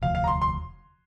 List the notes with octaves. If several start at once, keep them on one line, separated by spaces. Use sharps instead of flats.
E1 D2 C3 F3 F5
F5
A#5
C6
C6